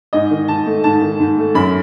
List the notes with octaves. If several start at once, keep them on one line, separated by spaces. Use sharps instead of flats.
G#2 D#5
D#3
G#2 A5
A3
G#2 A5
D#3
G#2
A3
F#2 B5